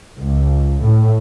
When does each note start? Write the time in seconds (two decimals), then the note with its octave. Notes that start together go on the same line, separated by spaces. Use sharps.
0.20 C#2
0.84 A2